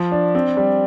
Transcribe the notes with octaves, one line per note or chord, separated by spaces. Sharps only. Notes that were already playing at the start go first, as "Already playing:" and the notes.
Already playing: F3
D4
C4
G3